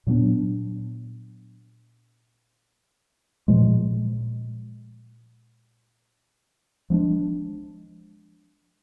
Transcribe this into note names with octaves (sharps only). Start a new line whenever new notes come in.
A#2 F#3 B3 D4
A#2 F3 G#3
F3 G#3 B3 D4